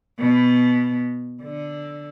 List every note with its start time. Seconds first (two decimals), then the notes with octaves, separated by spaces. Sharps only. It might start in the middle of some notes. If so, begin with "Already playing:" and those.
0.19 B2
1.42 D3